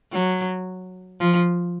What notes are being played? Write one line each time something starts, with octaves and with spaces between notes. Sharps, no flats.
F#3
F3